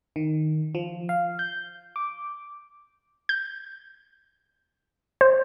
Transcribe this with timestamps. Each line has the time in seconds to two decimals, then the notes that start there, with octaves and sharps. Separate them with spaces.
0.16 D#3
0.75 F3
1.09 F5
1.39 G6
1.96 D6
3.29 G6
5.21 C5